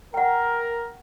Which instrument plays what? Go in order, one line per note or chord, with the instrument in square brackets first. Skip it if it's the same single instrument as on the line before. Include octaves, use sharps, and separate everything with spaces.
[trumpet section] A#4 [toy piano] F#5 G5